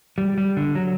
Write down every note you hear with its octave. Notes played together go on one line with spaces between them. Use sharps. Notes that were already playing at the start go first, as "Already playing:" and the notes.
G3
G3
D3
F#3